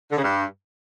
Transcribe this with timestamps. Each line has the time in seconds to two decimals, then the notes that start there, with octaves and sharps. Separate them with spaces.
0.10 D3
0.16 C#3
0.22 G2